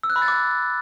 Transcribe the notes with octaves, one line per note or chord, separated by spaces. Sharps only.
E6
F#6
B5
A6
D6